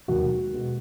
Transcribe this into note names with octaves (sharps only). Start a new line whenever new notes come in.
E1 D#2 D#3 F#3 F#4
B2 G#3 B3